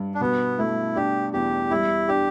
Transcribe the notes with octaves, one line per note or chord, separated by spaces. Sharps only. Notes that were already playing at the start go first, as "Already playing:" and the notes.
Already playing: G2
D4
B2 B3
A3 E4
D4 G4
E2 G4
G3 E4
D4 G4